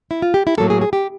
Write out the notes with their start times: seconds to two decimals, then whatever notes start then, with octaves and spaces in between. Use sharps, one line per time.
0.11 E4
0.22 F4
0.34 G4
0.47 E4
0.58 A2 F#3 A#3 A4
0.70 G#4
0.81 G#4
0.93 G4